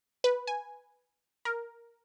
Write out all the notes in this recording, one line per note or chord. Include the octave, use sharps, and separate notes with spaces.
B4
G#5
A#4